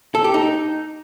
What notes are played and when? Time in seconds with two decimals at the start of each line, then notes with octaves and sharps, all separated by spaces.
0.15 A4
0.24 G4
0.34 D#4